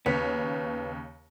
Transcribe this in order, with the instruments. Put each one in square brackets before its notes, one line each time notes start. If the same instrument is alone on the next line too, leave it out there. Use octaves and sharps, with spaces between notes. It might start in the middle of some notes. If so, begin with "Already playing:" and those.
[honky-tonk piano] D#2 C#3 C#5 [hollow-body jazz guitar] B3